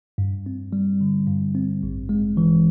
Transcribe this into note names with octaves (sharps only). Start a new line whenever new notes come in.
G2
C4
G3
D3
G2
C4
A1
G#3
E3